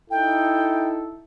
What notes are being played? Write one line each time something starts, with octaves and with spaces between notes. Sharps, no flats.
D#4 E4 A4 G5